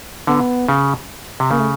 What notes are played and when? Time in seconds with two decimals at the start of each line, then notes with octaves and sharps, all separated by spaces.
0.27 D3 B3
0.69 C#3
1.40 C3
1.51 C#3 A#3
1.59 A3